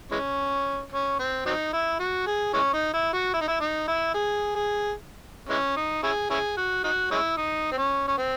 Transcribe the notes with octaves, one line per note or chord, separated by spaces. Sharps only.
E3 G#3 C#4
C#4
C4
F#3 C4 D#4
E4
F#4
G#4
E3 G#3 C#4
D#4
E4
F#4
E4
D#4
E4
D#4
E4
G#4
G#4
E3 G#3 C#4
D#4
C#4 E4 G#4
C#4 E4 G#4
F#4
D#4 F#4
G#3 C#4 E4
D#4
C4
C#4
C#4
C4